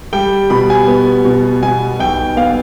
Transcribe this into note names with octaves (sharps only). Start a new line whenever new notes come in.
G3 G5
B2 B5
G#5
B3
B2
B2 G#5
B1 G5
B3 F5